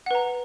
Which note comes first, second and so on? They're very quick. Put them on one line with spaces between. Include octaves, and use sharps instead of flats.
F#5 B4 A#5